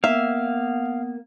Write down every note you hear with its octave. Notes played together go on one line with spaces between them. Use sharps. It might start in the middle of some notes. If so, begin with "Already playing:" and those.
A#3 B3 E5 F5